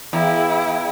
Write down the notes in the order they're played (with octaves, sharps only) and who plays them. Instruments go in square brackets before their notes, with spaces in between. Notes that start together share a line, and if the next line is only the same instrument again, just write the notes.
[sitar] E2 [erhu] E4 [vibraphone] G#4 F5 G5